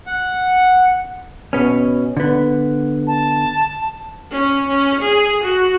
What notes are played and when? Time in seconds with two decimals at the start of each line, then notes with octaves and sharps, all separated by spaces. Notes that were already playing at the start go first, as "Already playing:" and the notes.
0.07 F#5
1.53 B2 B3 C#4
2.17 D3 B3
3.07 A5
4.32 C#4
4.68 C#4
5.01 G#4
5.43 F#4